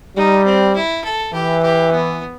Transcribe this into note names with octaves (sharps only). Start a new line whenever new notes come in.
G3 D#4
C4
E4
A4
E3 G4
G4
B3